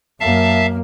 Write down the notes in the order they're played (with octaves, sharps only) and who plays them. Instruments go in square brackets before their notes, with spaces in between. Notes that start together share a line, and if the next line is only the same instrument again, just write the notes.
[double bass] F#2 A#3 [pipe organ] E5 F5 A5